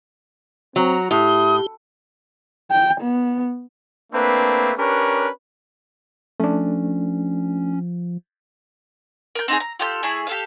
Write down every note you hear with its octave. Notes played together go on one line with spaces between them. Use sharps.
F#3 C4 A#5
A2 E4 G4 D#6
G5
B3
A3 A#3 C4 D4 B4
C#4 D4 G4 A#4 B4 C#5
F3 A3 C#4 D4
A#4 G6
C4 D#4 F4 G#4
A#5
F4 G4 A4 G6
A3 E4 G#4
G4 A4 F5